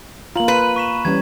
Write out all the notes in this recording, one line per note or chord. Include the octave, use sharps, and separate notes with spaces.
A#3 F4 A#5 F#7
B4 D#7
C#6 B6 E7
E3 G3 C#4 G#6